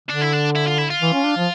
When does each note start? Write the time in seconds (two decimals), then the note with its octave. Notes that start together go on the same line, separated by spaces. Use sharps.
0.09 D3 D4
0.21 E4
0.33 D4
0.55 E4
0.67 F4
0.78 E4
0.90 F4
1.02 E3
1.13 C#4
1.25 D4
1.37 F3